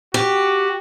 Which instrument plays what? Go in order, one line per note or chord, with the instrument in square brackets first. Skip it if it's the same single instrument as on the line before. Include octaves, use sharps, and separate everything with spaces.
[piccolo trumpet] F#4 [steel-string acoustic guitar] G4